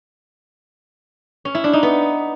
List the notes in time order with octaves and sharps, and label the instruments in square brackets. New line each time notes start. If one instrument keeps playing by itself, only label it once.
[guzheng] C#4
E4
D4
D#4
B3